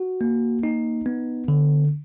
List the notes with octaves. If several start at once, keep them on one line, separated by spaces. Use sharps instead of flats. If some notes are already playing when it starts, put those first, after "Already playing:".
Already playing: F#4
A#3
D#4
B3
D3